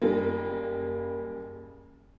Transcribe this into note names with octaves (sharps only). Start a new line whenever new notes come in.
F#1 G3 A#3